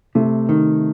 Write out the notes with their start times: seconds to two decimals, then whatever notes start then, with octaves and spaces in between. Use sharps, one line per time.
0.15 C3 A3
0.49 D#3